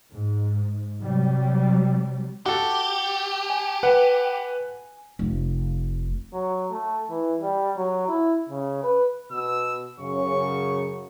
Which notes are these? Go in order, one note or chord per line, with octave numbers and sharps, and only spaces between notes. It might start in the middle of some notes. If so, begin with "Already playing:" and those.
G#2
C3 F#3 G3
F#4 G4 A4
G#5
B4 F#5
F1
F#3
A3
E3
G3
F#3
E4
C#3
B4
B2 E6
F#2 C#3 C#6